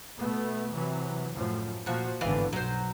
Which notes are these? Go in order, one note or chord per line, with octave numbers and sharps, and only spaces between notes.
B2 A3 B3
C3 E3 F#3
F#2 A2 F3
A#2 F3 F#4
G#1 G2 D3 E3 B3 F5
B1 F#3 C5